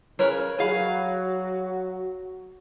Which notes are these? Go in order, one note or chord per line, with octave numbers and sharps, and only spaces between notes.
C#3 A#4 B4 C#5
F#3 F#4 G#4 F5 B5